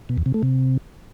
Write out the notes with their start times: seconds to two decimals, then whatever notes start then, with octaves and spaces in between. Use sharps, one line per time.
0.09 B2
0.18 E2
0.26 C3
0.34 A3
0.43 C3